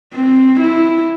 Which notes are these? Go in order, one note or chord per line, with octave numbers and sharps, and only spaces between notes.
C4
E4